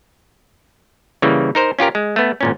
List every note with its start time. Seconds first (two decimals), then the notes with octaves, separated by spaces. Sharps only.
1.22 C#3 E3 G3 A#3
1.55 D#4 A#4 C5
1.79 C#4 F4 G4 A#4
1.95 G#3
2.16 A3 B3
2.41 G#1 A#2 C#4